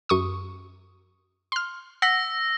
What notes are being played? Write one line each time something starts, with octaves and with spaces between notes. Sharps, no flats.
F#2 C#6 D#6
C6 F6
F#5 E6 A#6 B6